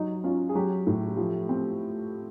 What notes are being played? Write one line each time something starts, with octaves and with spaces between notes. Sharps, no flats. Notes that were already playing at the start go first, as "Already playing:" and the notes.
Already playing: F#3 D#4
C#4 F4
G#4
F#3 G4
A2
F3
C4